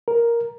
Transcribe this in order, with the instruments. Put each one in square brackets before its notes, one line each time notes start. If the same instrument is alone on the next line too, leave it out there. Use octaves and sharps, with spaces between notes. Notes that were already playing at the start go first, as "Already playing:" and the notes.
[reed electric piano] A#4